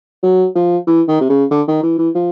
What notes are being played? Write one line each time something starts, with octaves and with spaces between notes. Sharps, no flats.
F#3
F3
E3
D#3
C3
C#3
D3
D#3
E3
E3
F3